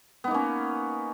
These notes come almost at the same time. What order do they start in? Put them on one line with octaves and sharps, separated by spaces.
B3 D#4 A#3 C#4